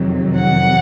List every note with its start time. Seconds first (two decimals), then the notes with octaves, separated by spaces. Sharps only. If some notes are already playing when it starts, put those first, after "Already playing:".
Already playing: F2 C3 D#3 F#3
0.37 F#5